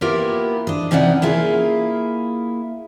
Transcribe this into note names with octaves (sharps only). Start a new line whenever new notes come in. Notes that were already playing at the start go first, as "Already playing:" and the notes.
A#3 B3 E4 F4 G4 A#4
D4 D#5
C3 C#4 D#4 E4 D5 F#5
A#3 E4 F4 G#4